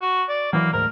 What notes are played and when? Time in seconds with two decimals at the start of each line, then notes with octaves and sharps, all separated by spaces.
0.02 F#4
0.29 D5
0.53 E3 F#3 A#3
0.73 D2 G#2 A#4